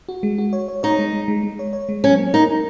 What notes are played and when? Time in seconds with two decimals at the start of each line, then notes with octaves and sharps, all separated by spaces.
0.09 F#4
0.23 G#3
0.38 F#4
0.53 C#5
0.68 C#5
0.83 D#4 C#5
0.99 G#3
1.13 G#3
1.28 G#3
1.43 G#3
1.59 C#5
1.73 C#5
1.89 G#3
2.04 F#3 C#4
2.18 A#3
2.34 D#4 A#4
2.49 A#3